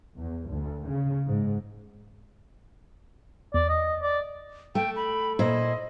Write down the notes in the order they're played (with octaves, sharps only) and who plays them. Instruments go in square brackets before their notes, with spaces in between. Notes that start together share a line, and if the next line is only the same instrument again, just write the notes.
[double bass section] E2
D2
C#3
G#2
[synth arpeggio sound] E2 [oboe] D5
[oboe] D#5
D5
[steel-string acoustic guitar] A3 [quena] G5
[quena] B5
[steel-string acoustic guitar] A#2 E4 C5 [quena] D#5